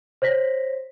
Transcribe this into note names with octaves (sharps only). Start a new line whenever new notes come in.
C5 C#5 A#6 B6